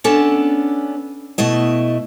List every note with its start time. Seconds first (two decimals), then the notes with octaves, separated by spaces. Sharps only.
0.04 B3 C#4 D4 A4
1.38 B2 A3 E4 D#5